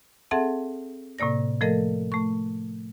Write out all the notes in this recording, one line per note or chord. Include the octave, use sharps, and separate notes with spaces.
C4 G#4 A4 E5 F#5 A5
A2 C3 A#3 D5 A#6
F3 A3 A4 A#4 D#5
A3 C#6